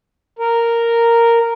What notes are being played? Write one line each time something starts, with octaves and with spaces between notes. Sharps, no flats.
A#4